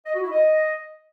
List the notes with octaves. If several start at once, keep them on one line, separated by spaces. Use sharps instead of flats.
D#5
F#4
E4
D#5